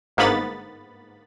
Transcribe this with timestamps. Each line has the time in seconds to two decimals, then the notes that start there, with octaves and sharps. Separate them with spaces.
0.17 G1 G#2 A#3 B3 B5 A6